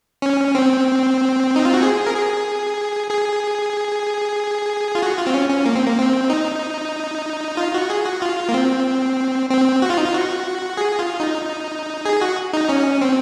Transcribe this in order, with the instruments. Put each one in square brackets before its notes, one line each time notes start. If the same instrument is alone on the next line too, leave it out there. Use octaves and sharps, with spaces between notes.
[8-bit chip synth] C#4
C4
D#4
F4
F#4
G#4
A#4
G#4
G#4
F4
F#4
F4
C4
C#4
C#4
A#3
C4
A#3
C4
D#4
F4
F#4
G#4
F#4
F4
A#3
C4
C4
F#4
F4
D#4
F4
F#4
G#4
F4
D#4
G#4
F#4
D#4
C#4
C4